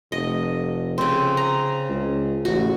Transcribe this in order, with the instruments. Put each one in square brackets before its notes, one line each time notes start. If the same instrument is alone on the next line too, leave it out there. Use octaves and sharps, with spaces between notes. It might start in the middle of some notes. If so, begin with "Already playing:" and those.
[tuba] F1 [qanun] D#5
[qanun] C#3 C4
A#5
[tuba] C#2
[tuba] A1 [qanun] F#4